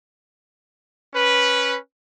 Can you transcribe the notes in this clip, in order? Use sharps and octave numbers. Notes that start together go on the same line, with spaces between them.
C#4 B4